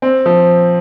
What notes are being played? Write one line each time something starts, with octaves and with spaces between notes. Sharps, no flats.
C4
F3